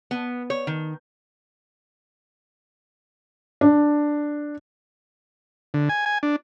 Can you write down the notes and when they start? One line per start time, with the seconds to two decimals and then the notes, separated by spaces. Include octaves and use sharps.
0.11 B3
0.50 C#5
0.67 D#3
3.61 D4
5.74 D3
5.89 G#5
6.06 G#5
6.23 D4